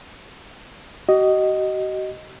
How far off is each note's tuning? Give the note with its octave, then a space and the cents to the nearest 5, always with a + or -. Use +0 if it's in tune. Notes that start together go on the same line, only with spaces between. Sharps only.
F#4 +45 D#5 +0